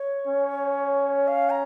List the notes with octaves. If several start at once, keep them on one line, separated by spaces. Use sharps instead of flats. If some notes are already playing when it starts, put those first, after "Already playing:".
Already playing: C#5
C#4
F5
A#5